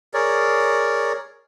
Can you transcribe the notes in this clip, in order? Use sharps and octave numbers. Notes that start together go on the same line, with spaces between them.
G#4 A#4 C#5 D5